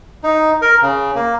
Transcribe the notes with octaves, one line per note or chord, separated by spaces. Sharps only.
D#4
A#4
C#3
A#3